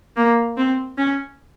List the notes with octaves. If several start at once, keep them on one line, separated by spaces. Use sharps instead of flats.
A#3
C4
C#4